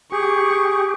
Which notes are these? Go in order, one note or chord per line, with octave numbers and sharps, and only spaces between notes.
G4 G#4 C#6